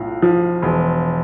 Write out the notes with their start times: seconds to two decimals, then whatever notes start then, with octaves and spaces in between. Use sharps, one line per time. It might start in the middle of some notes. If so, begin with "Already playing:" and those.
Already playing: B1 A2 F4
0.22 F3
0.62 E1